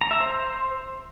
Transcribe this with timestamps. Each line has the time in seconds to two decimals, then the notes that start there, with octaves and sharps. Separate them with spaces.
0.01 A#5
0.11 E5
0.20 C5